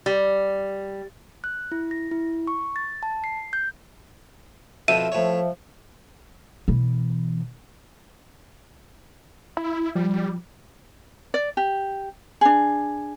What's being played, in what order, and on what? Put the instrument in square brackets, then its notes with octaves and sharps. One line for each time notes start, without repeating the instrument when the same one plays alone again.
[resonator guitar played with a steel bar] G3
[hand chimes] F#6
E4
A#6
E4
C#6
A6
A5
C7
G6
[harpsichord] F2 B2 F3 [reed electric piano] E5 [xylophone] D#7
[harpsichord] A2 C#5 [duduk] F3
[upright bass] B2 E3
[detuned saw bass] E4
[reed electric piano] F3 [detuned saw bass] G3
[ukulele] D5
G4
D4 G#4